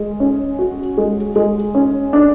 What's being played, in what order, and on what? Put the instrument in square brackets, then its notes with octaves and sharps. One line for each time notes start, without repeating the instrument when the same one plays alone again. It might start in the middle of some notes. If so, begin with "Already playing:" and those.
Already playing: [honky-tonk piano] G#3
C#4
F#4
G#3
G#3
C#4
D4